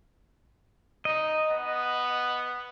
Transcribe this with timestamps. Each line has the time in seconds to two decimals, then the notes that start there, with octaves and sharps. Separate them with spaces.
1.05 D#4 D#5
1.50 B3